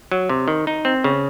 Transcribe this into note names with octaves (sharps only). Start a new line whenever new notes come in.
F#3
C3
D#3
D#4
C4
C#3